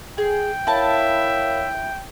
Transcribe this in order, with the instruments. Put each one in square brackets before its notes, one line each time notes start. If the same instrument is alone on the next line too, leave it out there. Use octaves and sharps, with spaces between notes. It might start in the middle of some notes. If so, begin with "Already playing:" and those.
[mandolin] G#4 [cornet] G5
[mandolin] E4 A5 [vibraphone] A#4 C#5 F5 [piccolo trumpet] E5